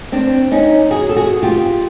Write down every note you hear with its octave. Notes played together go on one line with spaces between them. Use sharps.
C4 D4
C#4 D#4
F#4 G#4
A4
F#4 G#4
F4 G4